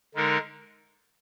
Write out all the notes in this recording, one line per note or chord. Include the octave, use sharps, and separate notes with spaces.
D3 G#3 D#4 A#4